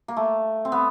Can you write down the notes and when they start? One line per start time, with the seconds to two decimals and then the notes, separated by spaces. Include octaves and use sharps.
0.08 A#3
0.17 A3
0.65 C4
0.72 B3